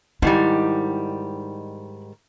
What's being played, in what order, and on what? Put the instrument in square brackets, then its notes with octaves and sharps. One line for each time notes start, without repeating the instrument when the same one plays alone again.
[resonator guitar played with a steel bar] G#2 D#3 G3 [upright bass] E4